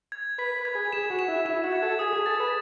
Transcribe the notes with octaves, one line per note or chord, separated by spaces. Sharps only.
G#6
B4 B6
B4
G#6
G#4
G#4 E7
F#4
E7
E4
E4 E7
F#4
G#6
A4
G#4 D#6
G#4
A4 A6
B4